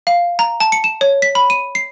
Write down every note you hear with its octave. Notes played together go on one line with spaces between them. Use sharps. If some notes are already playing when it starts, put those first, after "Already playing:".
F5
A#5
A5
C#7
E7
C#5
B6
B5
D#7
C7